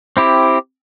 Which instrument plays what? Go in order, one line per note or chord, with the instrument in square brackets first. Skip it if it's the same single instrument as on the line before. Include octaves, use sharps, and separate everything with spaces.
[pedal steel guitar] C4 E4 G4